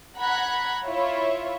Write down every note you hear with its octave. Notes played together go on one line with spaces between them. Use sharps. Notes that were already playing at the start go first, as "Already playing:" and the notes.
F#5 A#5 B5 F#6 G#6 B6
E4 F4 C#5 E5